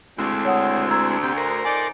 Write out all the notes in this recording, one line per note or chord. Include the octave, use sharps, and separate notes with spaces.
D2 G#3 C4 E4
C#5 F#5 D#6
A#5 E6 G#6
C4 G4
A#4 C5
F2 D#4 D5 G#5